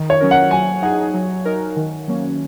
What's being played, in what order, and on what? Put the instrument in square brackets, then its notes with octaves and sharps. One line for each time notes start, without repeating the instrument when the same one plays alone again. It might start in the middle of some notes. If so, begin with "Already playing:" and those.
Already playing: [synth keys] D#3
[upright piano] C#5
[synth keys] F#3 C#4 A#4
[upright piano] F#5
[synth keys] F#3 [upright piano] G#5
[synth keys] D#4 G#4 [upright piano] F#5
[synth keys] F#3
D#4 A#4
D#3
F#3 A#3 C#4